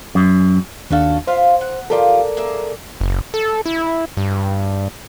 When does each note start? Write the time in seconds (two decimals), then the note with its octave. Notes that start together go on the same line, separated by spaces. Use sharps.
0.15 F#2
0.90 D#2 C#4 D4 F#4 A4 F5
1.27 F4 C5 E5 F5
1.61 F#5
1.90 F3 F4 G4 A4 A#4 D5
2.37 A#3 G#4 E5
3.01 F#1
3.34 A4
3.66 E4
4.17 G2